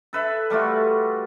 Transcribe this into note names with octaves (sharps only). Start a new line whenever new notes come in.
A4 B4 E5
G3 A3 F4 F#4